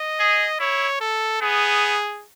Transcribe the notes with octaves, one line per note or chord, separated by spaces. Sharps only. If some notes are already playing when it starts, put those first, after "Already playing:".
Already playing: D#5
G#4
E4 C#5
A4
B3 G#4